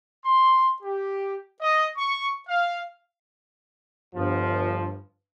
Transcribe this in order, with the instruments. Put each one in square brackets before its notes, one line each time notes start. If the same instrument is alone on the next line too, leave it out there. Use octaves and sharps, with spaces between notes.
[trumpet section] C6
G4
D#5
C#6
F5
[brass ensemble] G1 F3 [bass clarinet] G2